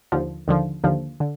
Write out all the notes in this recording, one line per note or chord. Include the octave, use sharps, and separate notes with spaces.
D#2 D3 F3
D#2 D3 F3
D#2 D3 F3
D3